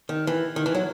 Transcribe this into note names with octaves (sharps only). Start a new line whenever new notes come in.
D#3
E3
D#3
E3
F#3